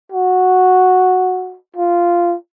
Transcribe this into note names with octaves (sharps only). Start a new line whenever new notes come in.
F#4
F4